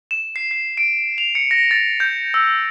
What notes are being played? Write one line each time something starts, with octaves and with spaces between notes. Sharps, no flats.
E7
C7
C7
D7
F7
C#7
A#6
A6
G6
E6